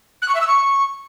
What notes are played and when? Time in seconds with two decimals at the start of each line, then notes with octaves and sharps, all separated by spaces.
0.22 F#6
0.28 C#6
0.35 E5
0.41 E6
0.47 C#6